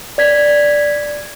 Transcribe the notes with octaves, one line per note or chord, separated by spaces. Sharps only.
D5 G#6 B6